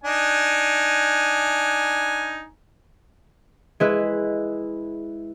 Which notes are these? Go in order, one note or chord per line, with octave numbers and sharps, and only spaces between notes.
D4 D#4 G#5
G#3 E4 B4